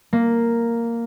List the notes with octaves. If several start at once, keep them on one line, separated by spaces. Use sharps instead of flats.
A#3